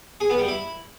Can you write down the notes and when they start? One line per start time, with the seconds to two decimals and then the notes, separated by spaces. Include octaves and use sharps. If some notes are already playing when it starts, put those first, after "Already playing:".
0.20 G#4
0.30 B3
0.39 G3
0.48 E4